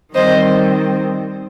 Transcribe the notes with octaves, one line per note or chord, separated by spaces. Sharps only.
D#3 G3 C4 C5 D#5